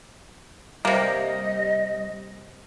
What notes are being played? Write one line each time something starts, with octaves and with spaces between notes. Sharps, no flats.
C3 G3 A#3 D#5